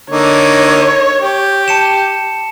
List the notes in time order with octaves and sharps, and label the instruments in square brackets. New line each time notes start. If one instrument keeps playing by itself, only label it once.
[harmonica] D3 A#3 D#4 [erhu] C#5
[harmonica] G4
[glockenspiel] A5 C#7 E7